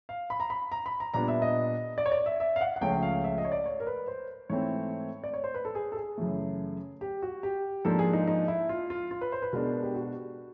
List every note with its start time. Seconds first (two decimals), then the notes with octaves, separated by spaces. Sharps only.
0.09 F5
0.30 B5
0.40 A#5
0.50 B5
0.72 A#5
0.86 B5
1.00 A#5
1.14 A#2 G3 B3 D4 A#5
1.28 E5
1.42 D#5
1.98 D5
2.06 C#5
2.12 D5
2.26 E5
2.40 E5
2.56 F5
2.61 F#5
2.76 F#5
2.81 C#2 C#3 F3 A3 C#4 G5
3.03 F5
3.24 E5
3.38 D#5
3.45 C#5
3.52 D5
3.66 C#5
3.80 A#4
3.87 B4
4.08 C5
4.49 G#2 E3 A3 C4 C#5
5.24 D5
5.34 C#5
5.44 C5
5.55 B4
5.65 A4
5.75 G#4
5.92 A4
5.97 G#4
6.18 F#2 C#3 E3 A3
7.01 G4
7.22 F#4
7.43 G4
7.85 G#2 F3 A#3 D4 A4
7.99 G#4
8.13 D#4
8.27 D#4
8.48 E4
8.69 F4
8.90 F4
9.11 F4
9.21 B4
9.32 C5
9.42 B4
9.53 B2 G#3 B3 D4 A#4
9.83 G4
9.95 F#4